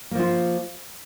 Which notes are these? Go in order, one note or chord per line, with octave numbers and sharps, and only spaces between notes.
F3 A#3 F4